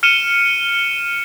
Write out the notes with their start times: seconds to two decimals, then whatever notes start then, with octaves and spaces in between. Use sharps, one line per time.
0.03 F6 C#7 D#7 E7 G7